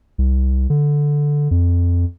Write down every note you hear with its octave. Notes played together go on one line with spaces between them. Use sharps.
C2
D3
F2